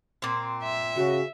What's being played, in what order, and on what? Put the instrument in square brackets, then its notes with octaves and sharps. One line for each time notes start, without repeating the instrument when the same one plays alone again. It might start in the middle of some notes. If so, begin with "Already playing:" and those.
[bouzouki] A#2 C4
[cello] E5
[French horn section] C#3 [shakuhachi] F#4